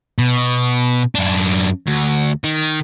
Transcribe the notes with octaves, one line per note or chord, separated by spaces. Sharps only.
B2
F#2 D4
D2
D#3